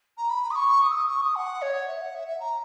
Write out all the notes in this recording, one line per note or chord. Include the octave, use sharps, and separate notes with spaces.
A#5
B5
D#6
C#6
D#6
E6
D#6
C#6
D#6
F#5
C#5
E5
F#5
E5
E5
A#5